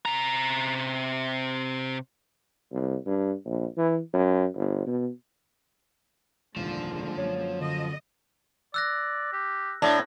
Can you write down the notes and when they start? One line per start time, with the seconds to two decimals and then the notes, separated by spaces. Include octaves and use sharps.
0.06 C3 A#5
2.72 C2
3.06 G2
3.45 A#1
3.77 E3
4.13 F#2
4.54 G1
4.86 B2
6.56 D#1 C2 G#2 D3 F3 G#3 A#3
7.17 F#2 C#5
7.61 D3 D#5
8.74 D5 E6 F#6 A#6
9.33 G4
9.82 A2 D4 A#5